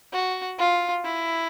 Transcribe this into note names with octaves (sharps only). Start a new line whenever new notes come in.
F#4
F4
E4